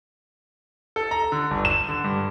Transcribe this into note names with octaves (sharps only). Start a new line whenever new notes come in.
A4
A#5
D3
G1
E7
D3
G2